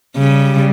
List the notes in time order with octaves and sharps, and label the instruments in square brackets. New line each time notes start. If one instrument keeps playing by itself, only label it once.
[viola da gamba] C#3 [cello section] G3